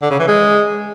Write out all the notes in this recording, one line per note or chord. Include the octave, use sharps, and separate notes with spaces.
D3
C#3
E3
G#3